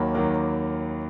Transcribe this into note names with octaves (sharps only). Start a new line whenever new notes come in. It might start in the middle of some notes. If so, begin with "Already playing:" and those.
Already playing: D#2 D#3 F#3 A#3 B5
D#2 D#3 F#3 A#3